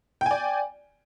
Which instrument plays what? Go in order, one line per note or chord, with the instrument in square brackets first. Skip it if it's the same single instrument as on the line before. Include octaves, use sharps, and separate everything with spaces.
[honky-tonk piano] G5
G#5
D5